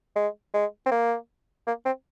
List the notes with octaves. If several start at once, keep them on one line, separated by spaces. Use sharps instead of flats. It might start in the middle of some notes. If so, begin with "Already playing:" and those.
G#3
G#3
C4
A#3
A#3
C4